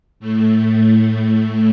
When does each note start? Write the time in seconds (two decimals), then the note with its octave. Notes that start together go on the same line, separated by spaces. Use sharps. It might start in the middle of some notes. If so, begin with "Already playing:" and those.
0.20 A2 A3